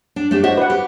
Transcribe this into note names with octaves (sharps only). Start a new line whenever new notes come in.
D4
A3 D4 G4
F#4 C5 D#5 E5
B4 F#5
G4